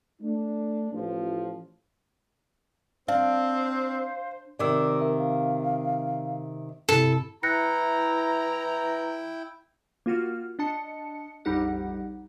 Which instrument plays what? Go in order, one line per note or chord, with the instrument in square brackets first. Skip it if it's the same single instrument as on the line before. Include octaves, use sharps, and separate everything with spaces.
[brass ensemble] A3 D4
A1 F3
[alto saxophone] C4 [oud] D4 [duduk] C5 [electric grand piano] F5
[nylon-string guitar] C3 D#3 [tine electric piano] D5 D6 E6
[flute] A#4 [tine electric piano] E5
[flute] F5
[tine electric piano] G2 C3 [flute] E4 [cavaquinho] A4
[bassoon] E3 [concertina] E4 G5 [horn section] A#5 [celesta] F#6 A#6 C#7
[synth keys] A#3 F4 F#4 F6
D4 D#5 A5 C#7
A#1 F2 G3 D#4 G4 F#5